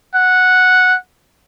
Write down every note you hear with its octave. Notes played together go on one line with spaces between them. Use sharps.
F#5